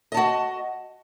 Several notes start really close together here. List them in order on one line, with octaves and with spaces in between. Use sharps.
D#5 A5 F#4